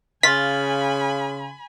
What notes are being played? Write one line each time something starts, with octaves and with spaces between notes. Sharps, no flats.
C#3 F4 G#5 B5 B6